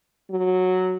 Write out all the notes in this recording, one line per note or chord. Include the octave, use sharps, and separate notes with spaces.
F#3